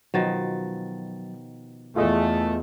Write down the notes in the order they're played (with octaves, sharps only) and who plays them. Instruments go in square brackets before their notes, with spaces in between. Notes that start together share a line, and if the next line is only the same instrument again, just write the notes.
[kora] B2 D#3 F3 [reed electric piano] F#3 A6
[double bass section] E2 [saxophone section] A3 [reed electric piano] F4 G#4 D#5